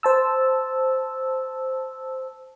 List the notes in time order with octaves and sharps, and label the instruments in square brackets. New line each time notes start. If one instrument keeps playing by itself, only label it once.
[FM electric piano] C5 A5 E6